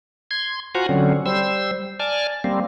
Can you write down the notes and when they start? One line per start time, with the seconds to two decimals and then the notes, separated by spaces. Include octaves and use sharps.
0.31 C6 G#6
0.75 F4 F#4 C5 F#5 G#5 A#5
0.89 D3 F#3 C4 C#4
1.26 G3 C5 E6
2.00 D5 G#5 A5 F6
2.44 G3 A#3 C4